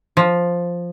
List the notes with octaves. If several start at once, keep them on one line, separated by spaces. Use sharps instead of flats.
F3